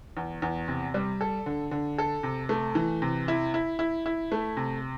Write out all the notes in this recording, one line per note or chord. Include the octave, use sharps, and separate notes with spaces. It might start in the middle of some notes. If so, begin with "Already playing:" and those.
E2
E2
C3
G3
A4
D3
D3
A4
C3
A3
E3
C3
E4
E4
E4
E4
A3
C3